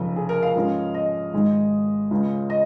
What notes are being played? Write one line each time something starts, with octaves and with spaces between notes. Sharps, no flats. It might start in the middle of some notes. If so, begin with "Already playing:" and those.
Already playing: F1 F2 C#3
G#4
A#4
F5
G#2 F3 G#3 C#4
D#5
G#1 G#2 G#3 D#4
C#2 C#3 G#3 C#4
D#5